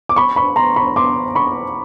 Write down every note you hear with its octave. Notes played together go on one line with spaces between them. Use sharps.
D6
B5 C#6
B5 C#6
A#5 C6
B5 C#6
C6 D6
B5 C#6